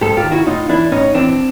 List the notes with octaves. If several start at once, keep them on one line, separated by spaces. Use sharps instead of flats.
G#2 G4 A4
F4 G4
D#3
E4 F#4
A2 D#4 F4
E3 D4 E4
A2 C#4 D#4
E3 C4 D4